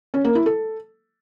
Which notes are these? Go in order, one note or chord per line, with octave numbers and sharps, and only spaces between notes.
C#4
A#3
E4
A4